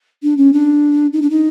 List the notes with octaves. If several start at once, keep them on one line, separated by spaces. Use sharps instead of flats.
D4
C#4
D4
D#4
D4
D#4